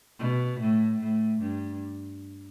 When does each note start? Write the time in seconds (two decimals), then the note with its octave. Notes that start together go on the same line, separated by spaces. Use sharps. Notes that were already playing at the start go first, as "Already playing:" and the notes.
0.19 B2
0.60 A2
1.00 A2
1.40 G2